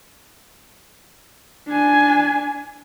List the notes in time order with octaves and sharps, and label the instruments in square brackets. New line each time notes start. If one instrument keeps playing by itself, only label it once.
[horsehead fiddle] D4 G#5